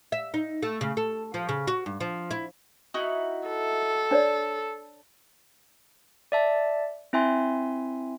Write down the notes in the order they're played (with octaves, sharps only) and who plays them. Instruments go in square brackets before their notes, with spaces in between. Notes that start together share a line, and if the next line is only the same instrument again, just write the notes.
[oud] E5
D#4
A3
C#3
A4
F3
C#3
F#4
G2
F3
E4
[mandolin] D#4 E4 F#4
[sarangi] A4
[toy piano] D4 C#5 D5
[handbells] D5 E5 A5
C4 E4 E5 G#5 C6